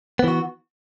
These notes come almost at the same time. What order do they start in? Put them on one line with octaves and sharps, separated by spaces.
B3 E3 F#4